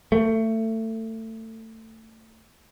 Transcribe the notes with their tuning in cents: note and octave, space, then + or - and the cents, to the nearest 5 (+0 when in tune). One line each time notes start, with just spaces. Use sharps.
A3 +25